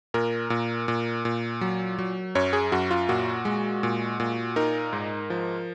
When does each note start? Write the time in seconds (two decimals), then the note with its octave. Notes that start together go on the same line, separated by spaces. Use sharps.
0.14 A#2 A#4
0.50 A#2
0.88 A#2
1.25 A#2
1.61 F#3
1.98 F#3
2.35 F#2 C#5
2.53 G#4
2.72 F#2 F#4
2.91 F4
3.09 A#2 F#4
3.45 G#3
3.83 A#2
4.20 A#2
4.56 D#4 A#4
4.93 G#2
5.30 F3